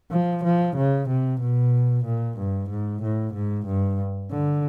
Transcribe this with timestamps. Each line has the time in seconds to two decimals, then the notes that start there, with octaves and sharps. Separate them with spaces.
0.11 F3
0.44 F3
0.76 C#3
1.09 C3
1.41 B2
2.05 A#2
2.38 G2
2.70 G#2
3.02 A2
3.34 G#2
3.66 G2
4.31 D3